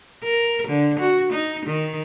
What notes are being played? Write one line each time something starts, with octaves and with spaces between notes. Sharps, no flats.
A#4
D3
F#4
D#4
D#3